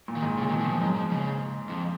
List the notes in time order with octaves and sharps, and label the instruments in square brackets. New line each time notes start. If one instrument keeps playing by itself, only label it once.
[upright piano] A#2
[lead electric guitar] D#3
[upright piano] G#2
[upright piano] A#2 [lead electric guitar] C#3
[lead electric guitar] D#3
[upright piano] B2
[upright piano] A#2 [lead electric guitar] D#3
[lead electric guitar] F3
[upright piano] G#2 B2 [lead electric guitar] F#3
[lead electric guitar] F3
C#3
F2